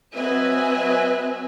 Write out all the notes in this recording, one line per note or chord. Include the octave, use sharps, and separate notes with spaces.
F#3 C4 B4 D#5 E5 G#5